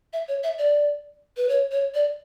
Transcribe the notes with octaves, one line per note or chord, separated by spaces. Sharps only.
E5
C#5
E5
D5
B4
C#5
C#5
D5